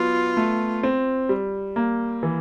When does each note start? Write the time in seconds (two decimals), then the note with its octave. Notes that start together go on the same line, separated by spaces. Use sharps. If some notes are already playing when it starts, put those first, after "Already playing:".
Already playing: F#3 B3 F4
0.37 A3
0.83 C4
1.29 G3
1.76 A#3
2.23 E3